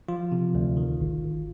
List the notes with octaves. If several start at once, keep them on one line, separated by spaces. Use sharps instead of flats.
F3 F4
C3
D2
D#3
G#1
G#1